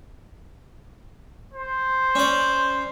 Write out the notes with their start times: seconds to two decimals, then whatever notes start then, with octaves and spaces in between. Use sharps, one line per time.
1.54 C5
2.15 C#4 D5